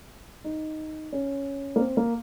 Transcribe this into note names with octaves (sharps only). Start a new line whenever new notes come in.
D#4
C#4
A#3
C4
A#3